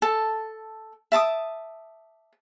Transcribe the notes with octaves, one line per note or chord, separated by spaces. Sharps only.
A4 A5
E5 A5 D6 D#6